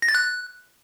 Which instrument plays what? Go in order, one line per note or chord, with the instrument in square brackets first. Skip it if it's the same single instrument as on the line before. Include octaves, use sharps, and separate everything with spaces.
[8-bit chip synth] A#6
A6
F#6